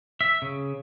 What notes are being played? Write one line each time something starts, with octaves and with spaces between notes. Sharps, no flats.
E5
C#3